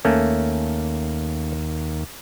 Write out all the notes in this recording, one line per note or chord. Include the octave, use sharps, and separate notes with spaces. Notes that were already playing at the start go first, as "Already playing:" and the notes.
D#2 A3 A#3 C#4